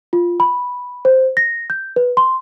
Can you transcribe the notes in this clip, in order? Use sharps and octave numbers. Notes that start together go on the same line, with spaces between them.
F4
B5
C5
A#6
G6
B4
C6